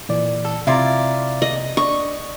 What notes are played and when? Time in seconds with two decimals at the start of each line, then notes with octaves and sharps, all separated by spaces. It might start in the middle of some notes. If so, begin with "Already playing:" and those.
0.09 A#2 E3 D5
0.45 A4
0.67 C3 E4 F4 D5 E5 A#5
1.42 D#5
1.77 D4 D5 D#5 C#6